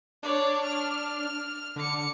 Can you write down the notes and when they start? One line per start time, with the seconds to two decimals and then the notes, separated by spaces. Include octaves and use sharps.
0.23 D4 C#5 D5
0.63 F6
1.76 D3 D6 C#7